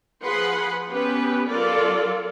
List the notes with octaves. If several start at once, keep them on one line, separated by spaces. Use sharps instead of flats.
F3 G#4 B4 F#5 B5 C6
B3 C#4 G4 B4
F#3 F4 A4 A#4 D5